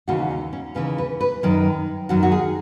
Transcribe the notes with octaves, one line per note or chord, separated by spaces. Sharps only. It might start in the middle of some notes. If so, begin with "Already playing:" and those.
D#2 C#3 E3 F#4
D#4
C#4
D#2 C#3 E3 B4
B4
B4
F#2 D#3
F#2 D#3 F#4
F#4
G#4